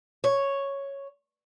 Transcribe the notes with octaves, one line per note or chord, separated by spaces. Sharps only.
C#5